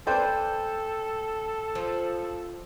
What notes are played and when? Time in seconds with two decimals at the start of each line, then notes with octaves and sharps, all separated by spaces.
0.07 A4 B4 C5 D5 G5
1.75 F3